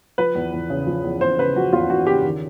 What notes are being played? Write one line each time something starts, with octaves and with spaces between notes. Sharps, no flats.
F3 B4
E2
E2
C#3
F3
E2
E2 C5
C#3 B4
F3 F#4
E2 F4
E2 F#4
C#3 G4
D#3